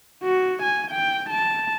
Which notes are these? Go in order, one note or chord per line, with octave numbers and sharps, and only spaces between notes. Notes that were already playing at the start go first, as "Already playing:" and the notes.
F#4
G#5
G5
A5